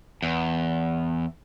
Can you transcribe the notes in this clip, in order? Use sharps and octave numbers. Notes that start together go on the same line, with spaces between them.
E2